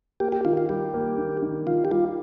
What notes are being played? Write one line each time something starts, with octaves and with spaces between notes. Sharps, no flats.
A#3 G4
G4
D#3 F4
F4
G3 G4
A#3
D#3
D#3
D#3 F4
G4
G3 F4